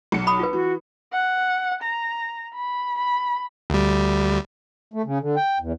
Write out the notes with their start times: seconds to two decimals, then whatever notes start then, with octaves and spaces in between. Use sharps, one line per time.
0.12 B1 F#3 C#7
0.27 B5 D#6
0.40 F4 B4
0.53 E3 F#4
1.12 F#5
1.83 A#5
2.55 B5
2.98 B5
3.70 D2 G3
4.94 A3
5.05 C#3
5.20 D3
5.36 G5
5.60 E2